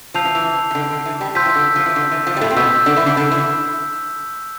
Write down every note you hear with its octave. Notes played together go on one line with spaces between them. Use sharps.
F3 A5 E6 G6 C7 F7
E3
E3
E3
D3
D3
E3
G3
F3 C6 E6 G6 B6
E3
D3
F3
E3
D3
E3
F3
G3
A2 A3
C4
B2 B3 E6 G6 B6
D3 D4
E3 E4
D3 D4
D3 D4
E3 E4